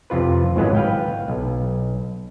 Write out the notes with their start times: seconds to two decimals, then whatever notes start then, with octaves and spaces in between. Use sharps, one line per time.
0.10 F2 C3 F4 B4
0.56 G#1 A2 F#3 G#3 B3 B4
0.75 B4 F5 G5
1.28 B1